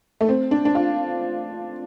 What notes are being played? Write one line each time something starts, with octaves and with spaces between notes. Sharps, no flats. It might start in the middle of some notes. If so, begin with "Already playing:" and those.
A3
C4
D4
D4
F4